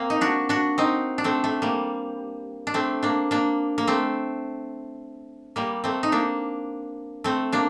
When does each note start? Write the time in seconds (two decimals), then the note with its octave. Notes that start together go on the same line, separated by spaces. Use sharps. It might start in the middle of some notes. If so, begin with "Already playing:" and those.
Already playing: A#3 C4
0.10 D#4
0.21 D4 F#4
0.49 D4 F#4
0.78 C4 D#4
1.18 D4
1.24 A3 C4
1.44 A3
1.62 G3 A#3
2.67 D4
2.74 A3 C4
3.03 A#3 D4
3.31 A#3 D4
3.78 A#3
3.87 A3 C4
5.56 G3 A#3
5.84 A3 C4
6.03 D#4
6.12 A#3 D4
7.24 A3 C4
7.52 A#3 D4